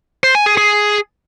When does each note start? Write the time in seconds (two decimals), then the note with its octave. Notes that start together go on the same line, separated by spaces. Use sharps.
0.24 C5
0.35 G#5
0.46 G#4
0.57 G#4